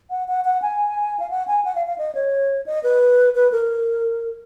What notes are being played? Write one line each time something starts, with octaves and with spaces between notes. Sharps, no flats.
F#5
F#5
F#5
G#5
F5
F#5
G#5
F#5
F5
F5
D#5
C#5
D#5
B4
B4
A#4